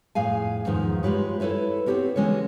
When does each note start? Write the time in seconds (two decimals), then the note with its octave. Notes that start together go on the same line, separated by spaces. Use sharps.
0.15 F2 A2 G#4 F5 G#5
0.66 E2 G#2 D#3 F3
1.03 G#3 F4 G4 B4 C#5
1.40 E4 A4 B4 C#5 E5
1.86 B3 C4 D4 G4 A#4 C#5
2.16 D3 E3 G#3 C#4 C#5